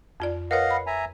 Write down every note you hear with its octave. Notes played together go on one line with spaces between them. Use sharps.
F2 F4 D5
A#4 B4 C#5 D#5 F5 F#5
B5
E5 G#5 A#5